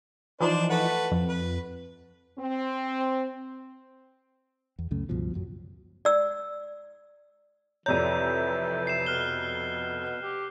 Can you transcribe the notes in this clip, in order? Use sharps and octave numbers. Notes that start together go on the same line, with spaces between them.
E3 F3 D4 D#4 C5
A3 B4 F#5
F2
B4
C4
E2
C#2 F#2 C#3 A3
C#2 G2 B2 F3
A1 F#2 F#3
D5 E6
F2 C3 E3 C#5 D5 A#5 G6 D#7
C7 E7
B2 F6 F#6 G7
G4